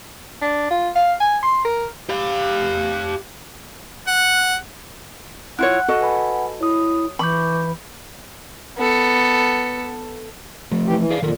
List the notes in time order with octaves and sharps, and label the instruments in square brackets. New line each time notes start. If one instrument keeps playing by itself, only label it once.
[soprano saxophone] D4
F4
F5
G#5
C6
A#4
[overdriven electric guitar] G4 F5
[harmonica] F#5
[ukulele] E4 F4 C#5 [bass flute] F#5 [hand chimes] F#6
[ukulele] F#4 A4 D#5
[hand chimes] B4 G#5 B5
[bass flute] E4 [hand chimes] C#5 D#6
[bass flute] E3 [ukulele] B5 [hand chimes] C#6 D6 G6
[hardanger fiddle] B3 A4
[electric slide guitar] F3 A3
[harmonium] E3 G4
E3
[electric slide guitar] G#4 D5 F5
[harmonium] F2 A#2 [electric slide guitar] D#3 A4 A#4